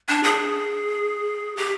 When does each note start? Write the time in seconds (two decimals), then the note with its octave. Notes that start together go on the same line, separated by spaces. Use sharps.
0.09 D4
0.24 G#4
1.57 G4